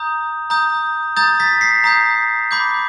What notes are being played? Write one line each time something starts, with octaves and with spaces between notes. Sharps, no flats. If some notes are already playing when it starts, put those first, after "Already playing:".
Already playing: A#5 D#6 G6
A#5 D#6 G6
A#5 D#6 G6 A6
A6 B6
A#6 C7
A#5 D#6 G6
B5 D6 G6